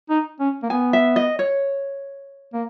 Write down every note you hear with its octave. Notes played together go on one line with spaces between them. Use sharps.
D#4
C#4
A#3
B3 G#5
E5
D#5
C#5
A#3